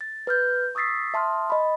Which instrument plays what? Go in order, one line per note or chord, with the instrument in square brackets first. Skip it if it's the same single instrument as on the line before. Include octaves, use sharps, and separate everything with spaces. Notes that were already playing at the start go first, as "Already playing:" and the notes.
[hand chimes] A6
B4 F6 G6
C#6 D#6 E6 A6 B6 C7
E5 A5 C6 D#6 F6
D#5 B5